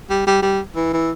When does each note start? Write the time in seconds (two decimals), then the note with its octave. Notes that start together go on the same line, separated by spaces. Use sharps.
0.10 G3
0.27 G3
0.42 G3
0.76 E3
0.93 E3